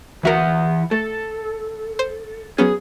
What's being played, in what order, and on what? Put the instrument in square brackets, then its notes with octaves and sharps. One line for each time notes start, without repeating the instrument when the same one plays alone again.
[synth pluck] D2 F#4 A#4 [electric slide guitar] E3 E5 F#5
[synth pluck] A3 [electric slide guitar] A4
[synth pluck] C5
[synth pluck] F#3 B3 C#4 [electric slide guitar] G#4